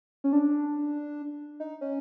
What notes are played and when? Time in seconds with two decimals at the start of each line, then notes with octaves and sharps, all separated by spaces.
0.24 C#4
0.33 D4
1.60 D#4
1.81 C#4